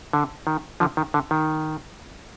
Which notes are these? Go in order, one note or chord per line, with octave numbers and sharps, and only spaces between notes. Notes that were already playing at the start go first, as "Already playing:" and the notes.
D3
D#3
D3 F3
D#3
D3
D#3